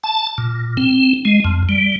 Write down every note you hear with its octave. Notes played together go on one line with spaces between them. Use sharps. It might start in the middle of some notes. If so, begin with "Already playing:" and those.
A5
A#2
C4
G#3
F2
G3